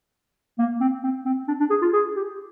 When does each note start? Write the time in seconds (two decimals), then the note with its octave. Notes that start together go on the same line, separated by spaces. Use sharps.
0.58 A#3
0.80 C4
1.03 C4
1.25 C4
1.48 D4
1.60 D4
1.70 G#4
1.82 F4
1.93 G#4
2.16 G4